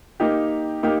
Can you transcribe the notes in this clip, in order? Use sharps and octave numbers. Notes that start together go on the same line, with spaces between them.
A#3 D#4 G4
A#3 D#4 G4